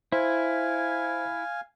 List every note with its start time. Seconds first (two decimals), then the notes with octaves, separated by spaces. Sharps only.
0.12 E4 C5 F5 G#5